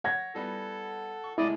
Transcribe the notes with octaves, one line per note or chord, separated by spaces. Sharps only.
C#5 F#5 G#6 A#6
E3 G3 B3 A4
C#6
C2 A2 G#3 E4 D5 D#5